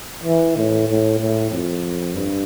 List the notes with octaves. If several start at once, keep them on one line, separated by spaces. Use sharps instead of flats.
E3
A2
A2
A2
F2
G2